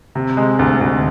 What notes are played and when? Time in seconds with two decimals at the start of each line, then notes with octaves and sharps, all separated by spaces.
0.15 C3
0.37 G#3
0.59 D2
0.81 D2